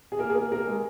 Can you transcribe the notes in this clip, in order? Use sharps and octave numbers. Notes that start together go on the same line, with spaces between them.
G#4
A#3 A#4
G#4
A#3 A#4
A#3 A#4
G#3 G#4